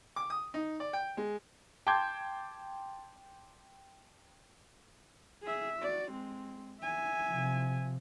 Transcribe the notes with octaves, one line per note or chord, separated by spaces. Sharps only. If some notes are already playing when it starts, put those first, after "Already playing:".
D6
D#6
D#4
D5
G5
G#3
G5 A5 C6 D6 G6 G#6
G#4 E5
F#4 D5
G#3 C4
E5 G#5
C3 F3